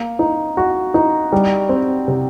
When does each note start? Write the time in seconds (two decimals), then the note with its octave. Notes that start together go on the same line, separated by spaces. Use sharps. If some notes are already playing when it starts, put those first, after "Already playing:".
Already playing: A#3
0.19 D#4
0.57 F#4
0.94 D#4
1.32 G3
1.69 C4
2.08 C3